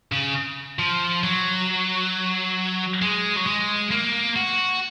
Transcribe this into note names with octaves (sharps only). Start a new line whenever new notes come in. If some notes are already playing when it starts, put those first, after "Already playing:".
C#3
F3
F#3
G#3
F#3
G#3
A#3
F#4